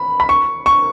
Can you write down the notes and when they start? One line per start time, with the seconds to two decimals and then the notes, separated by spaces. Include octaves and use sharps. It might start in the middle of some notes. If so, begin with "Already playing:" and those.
Already playing: B5
0.20 B5
0.29 C#6
0.66 C#6